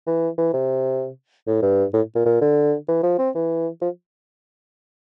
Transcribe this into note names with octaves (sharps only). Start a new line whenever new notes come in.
E3
E3
C3
A2
G2
A2
A#2
A#2
D3
E3
F3
C4
E3
F3